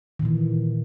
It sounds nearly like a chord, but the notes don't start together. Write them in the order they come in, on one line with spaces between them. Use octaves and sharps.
D#3 A#2 E3